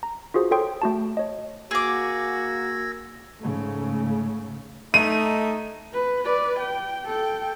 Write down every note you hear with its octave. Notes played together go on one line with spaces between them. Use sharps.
A#5
F4 F#4 G#4 C5
A4 C#5 G5 C6 D#6
A3 F#4 A5
C#5 D#5
A#3 F#4 G#4 D6 E6 G#6 A#6
G#2 C#3 A3
A3 D#4 D#7
B4
B4 D5
G5
A4 G5